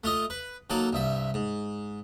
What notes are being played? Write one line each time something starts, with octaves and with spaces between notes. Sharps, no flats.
A3 F4 D#5
B4
D#3 F#3 A#3 A4
C2 G2 E5
G#2